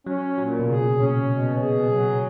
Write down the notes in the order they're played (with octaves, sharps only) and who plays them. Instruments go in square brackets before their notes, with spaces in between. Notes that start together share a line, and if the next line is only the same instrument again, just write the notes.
[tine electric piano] F#3 [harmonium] C#4
[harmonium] A#2 [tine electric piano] F#3
[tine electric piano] B2
[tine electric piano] C#3 [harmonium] G#4
[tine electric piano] A#2 [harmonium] C#4
[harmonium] B2
G#4
F#3